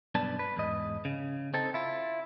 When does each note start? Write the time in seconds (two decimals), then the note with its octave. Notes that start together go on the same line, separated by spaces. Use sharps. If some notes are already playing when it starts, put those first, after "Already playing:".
0.15 B1 G2 B3 D4 A5
0.39 B4
0.56 E2 G#2 D#5
1.05 C#3
1.54 C4 D#4 A4
1.74 E4 F4